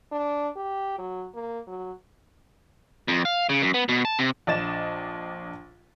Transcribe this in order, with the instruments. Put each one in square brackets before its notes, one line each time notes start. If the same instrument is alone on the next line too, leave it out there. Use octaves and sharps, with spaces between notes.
[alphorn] D4
G4
F#3
A#3
F#3
[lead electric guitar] F2
F5
C#3
F#2
B3
B2
A5
C3
[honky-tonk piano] A#1 D4 D#5 A6 E7